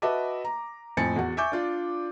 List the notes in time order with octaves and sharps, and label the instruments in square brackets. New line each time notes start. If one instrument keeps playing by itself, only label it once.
[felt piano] F#4 B4 D#5 E5 A5 D6
A#5
F2 A2 C4 G#5 A6 C#7
E2 F#4
E5 G#5 C#6 D6 G6
D4 F4 D5